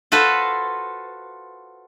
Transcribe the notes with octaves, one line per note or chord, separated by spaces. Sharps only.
F4 F#4 A4 B4 C5